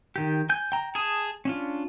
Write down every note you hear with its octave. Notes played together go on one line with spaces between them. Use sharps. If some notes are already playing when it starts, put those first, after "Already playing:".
D#3 G4
G#5 G6
G5 A#5
G#4 G#5 A5 D#6
C#4 D4 F4